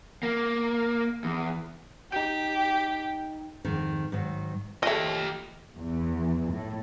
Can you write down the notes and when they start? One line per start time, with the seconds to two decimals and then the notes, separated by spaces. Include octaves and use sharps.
0.23 A#3
1.24 E2
2.12 D#4 G4 G5
3.64 F2 G#2 D#3
4.12 G#2 D#3 F#3
4.83 F3 A3 G4 D#5
5.76 E2
6.52 A2